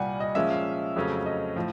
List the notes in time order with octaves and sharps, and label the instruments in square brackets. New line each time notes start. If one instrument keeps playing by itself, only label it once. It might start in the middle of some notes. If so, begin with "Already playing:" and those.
Already playing: [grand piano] C2 A#2 G3 F#5 G#5
D#5
A#2 F3 G#3 C#4 E5
F5
F2 C#3 F#3 A3 C#4
D#5
A2 F3